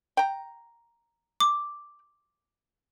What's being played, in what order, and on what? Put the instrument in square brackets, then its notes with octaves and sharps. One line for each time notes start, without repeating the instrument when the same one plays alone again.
[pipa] G5 A#5
[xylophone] D6